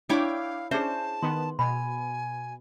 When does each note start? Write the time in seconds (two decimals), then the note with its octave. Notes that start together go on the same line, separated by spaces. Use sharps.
0.09 D4 E4 C#5 F5 G5 B5 D6
0.71 C#4 D4 G#4 C5 E5 A5
1.23 D#3 B3 C6
1.59 B2 G#5 B5